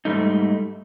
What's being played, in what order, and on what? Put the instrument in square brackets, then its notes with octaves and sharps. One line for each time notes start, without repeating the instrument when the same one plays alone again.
[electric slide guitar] G#2 G3 A3 D#4